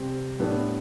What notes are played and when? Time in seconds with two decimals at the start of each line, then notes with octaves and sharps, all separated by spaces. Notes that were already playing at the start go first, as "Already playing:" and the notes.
Already playing: C3 G3 C4
0.39 A2 G3 B3 D4